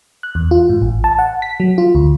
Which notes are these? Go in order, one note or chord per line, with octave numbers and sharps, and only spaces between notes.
F#6
E2
F4
G#2
A1
A5
F#5
B6
F#3
F4
D2